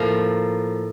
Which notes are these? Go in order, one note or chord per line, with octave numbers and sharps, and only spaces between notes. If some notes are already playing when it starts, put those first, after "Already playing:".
Already playing: A2 F3 A#3 A#4